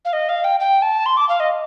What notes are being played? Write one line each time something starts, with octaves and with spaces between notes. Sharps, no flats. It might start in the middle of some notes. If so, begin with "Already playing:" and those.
F5
D#5
F5
G5
G5
A5
C6
D6
F5
D#5